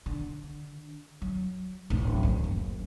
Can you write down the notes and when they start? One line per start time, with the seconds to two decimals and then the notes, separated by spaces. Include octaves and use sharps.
0.06 D3
1.22 F#3
1.90 D1 A1
2.23 D2 D#3
2.44 F#1